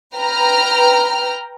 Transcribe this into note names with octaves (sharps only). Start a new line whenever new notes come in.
B4 G5 A#5 F6